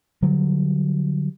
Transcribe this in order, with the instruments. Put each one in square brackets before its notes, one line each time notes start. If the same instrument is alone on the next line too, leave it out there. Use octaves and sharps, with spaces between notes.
[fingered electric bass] D3 F#3 G3